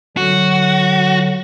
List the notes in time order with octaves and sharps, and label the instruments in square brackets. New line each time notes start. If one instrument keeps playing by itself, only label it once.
[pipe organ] D3 F#3 [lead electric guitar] F#4